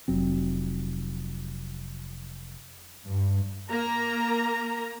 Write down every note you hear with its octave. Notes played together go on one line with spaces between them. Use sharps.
F1 F#3 C4
G2
A#3 A#5